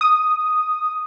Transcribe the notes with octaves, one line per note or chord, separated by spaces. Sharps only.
D#6